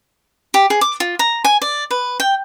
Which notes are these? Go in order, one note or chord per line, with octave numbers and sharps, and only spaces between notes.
G4
G#4
D6
F4
A#5
G#5
D5
B4
G5